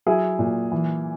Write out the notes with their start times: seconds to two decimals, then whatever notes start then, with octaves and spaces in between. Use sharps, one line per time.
0.06 F#3 E4 G#4
0.39 A#2
0.72 E3